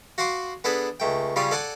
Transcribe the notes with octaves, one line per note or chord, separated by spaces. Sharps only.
F#4 F5 F#5 C6 D6
B3 D4 G#4 A4 B5
C#2 A3 G5
C#3 G3 F4 C#5 D5 D#6
A4 D5 F#5 G#5 A5